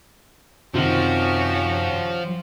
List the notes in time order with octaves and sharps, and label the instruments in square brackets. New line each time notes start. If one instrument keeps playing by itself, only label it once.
[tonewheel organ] F#2 [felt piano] C3 D#3 [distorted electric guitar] F3 [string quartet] C#4 F#4 G4